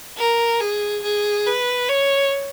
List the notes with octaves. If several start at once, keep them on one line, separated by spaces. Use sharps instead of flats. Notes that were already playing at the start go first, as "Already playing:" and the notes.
A#4
G#4
G#4
B4
C#5